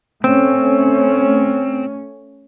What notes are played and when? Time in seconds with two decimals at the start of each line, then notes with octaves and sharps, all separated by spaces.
0.24 A3 C4 C#4